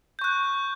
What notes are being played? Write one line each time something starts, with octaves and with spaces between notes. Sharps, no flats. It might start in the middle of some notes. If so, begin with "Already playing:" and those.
C#6 F#6 G6